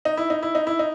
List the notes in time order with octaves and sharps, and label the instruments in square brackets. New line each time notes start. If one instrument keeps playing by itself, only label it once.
[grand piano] D#4
E4
D#4
E4
D#4
E4
D#4